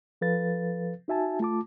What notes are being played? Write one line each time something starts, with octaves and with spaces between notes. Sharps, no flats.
F3 A4 B4 F5 A6
D#4 F#4 E5 G#5 A5
A3 F4 A5 D6